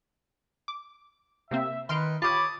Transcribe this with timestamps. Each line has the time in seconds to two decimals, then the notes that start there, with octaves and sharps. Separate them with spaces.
0.68 D6
1.51 C3 A#3 C4 E5
1.89 D#3 B4 C6 F6 D7
2.22 F4 G4 C#5 A5 B5 D6 D#6